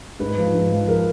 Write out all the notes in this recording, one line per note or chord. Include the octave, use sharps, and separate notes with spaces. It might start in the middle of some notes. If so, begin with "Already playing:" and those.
G#2 B4
F3
G#2
F3
A#4